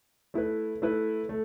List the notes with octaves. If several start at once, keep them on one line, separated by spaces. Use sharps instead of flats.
A3 E4 B4
A3 E4 B4
A3